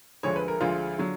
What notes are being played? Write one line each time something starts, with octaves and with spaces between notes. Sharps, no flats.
D2 D3 F3 G#3 C#5
B4
A#4
D2 D3 F3 G#3 F4
D3 F#3